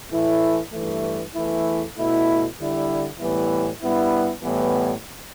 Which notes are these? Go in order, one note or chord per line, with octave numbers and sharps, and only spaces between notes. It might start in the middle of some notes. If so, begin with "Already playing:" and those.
A2 E3 A3 E4
G2 E3 A3
E2 E3 A3 E4
B2 A3 E4
D3 G3 E4
A2 E3 G3 B3 E4
G2 G3 B3 E4
A2 E3 G3 B3